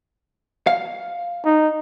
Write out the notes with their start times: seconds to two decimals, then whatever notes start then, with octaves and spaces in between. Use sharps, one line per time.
0.67 F5
1.45 D#4